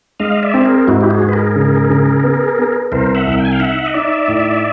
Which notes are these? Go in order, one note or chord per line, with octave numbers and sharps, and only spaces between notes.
G#3 D#5 F5
D5 E5
C4
G#4 A#4
G#2 E4 F#4
G4
F#4 G#4
G#2
B4
G#4 A#4
C#3
C#3
B3
B3
C2 A#4 C5
E5 F#5
C2
G5
G#5
F5 G5
D#4 E5 F#5
D#5
D#4 D5 E5
A2